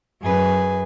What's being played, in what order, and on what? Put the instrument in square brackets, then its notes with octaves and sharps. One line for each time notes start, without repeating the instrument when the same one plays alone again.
[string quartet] F#2 G#4 B4